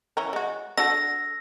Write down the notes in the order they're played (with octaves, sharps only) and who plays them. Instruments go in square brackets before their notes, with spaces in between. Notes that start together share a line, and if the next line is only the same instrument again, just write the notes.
[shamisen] E3 C#4 A#4
G#3 F#4
[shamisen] D4 F#4 A4 [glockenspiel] E6 A#6